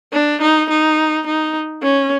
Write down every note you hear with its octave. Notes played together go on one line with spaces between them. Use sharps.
D4
D#4
D#4
D#4
C#4